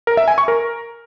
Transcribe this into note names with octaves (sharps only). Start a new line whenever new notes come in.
A#4
E5
G#5
C#6
A#4